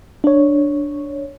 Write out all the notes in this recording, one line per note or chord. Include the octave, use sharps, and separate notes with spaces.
D4 C#5